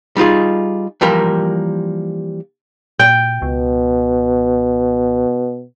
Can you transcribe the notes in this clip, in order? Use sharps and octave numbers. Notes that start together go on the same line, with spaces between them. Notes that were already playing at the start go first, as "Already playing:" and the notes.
G3 D#4 F4 G#4
E3 F3 G3 A#3 G4 A#4
A#2 G5
C#2 B2